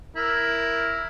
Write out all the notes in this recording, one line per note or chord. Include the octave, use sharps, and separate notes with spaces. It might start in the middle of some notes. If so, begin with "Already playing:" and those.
E4 A#4